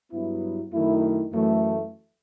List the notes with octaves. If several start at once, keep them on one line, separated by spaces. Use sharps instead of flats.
G2 F#3 B3 E4
F#2 D#3 A3 E4
F#2 E3 A3